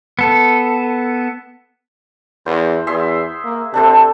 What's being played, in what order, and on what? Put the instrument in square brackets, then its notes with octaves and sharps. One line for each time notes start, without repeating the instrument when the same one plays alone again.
[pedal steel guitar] B3 A4
[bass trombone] E2 [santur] C5
[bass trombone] E2 [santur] G#4 E5 C6
[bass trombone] A#3
[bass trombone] C3 [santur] D4 A4 C5